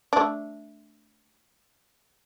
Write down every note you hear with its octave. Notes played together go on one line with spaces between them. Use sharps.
A3 D4